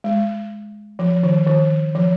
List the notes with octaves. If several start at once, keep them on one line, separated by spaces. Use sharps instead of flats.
G#3
F3
D#3
D#3
F3